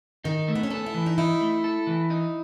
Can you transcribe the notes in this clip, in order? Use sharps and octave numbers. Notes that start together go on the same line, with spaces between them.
D#3 D#4
A3
B3
C#4
B3 A4
E4
E3
D#4
D#4 E4
A3
A4
E3
D#4